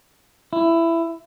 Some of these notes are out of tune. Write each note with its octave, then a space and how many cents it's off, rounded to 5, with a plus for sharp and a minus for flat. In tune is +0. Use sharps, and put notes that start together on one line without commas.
E4 +15